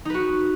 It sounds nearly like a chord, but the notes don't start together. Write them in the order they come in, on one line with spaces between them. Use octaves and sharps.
D#4 B4 F#4